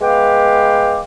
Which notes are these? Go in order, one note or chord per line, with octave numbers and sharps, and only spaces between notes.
G#3 B3 B4 F5 G5 D6